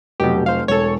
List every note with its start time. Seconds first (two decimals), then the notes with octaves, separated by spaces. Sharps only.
0.20 F1 B2 F#3 G4 D#5
0.46 C5 F5
0.68 E1 A4 C#5